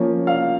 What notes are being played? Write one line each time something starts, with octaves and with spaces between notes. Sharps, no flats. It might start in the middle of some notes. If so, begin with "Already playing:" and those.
Already playing: F3 A#3 C#4
F5